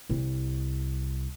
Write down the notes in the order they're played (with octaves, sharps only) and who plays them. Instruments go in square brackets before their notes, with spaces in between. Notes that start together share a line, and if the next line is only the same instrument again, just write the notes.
[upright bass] C2